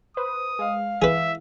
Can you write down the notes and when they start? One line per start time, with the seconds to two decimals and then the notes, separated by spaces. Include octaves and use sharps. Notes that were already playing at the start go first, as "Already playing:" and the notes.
0.17 B4 C5 D#6
0.59 G#3 F5
1.02 E3 G#4 B4 E5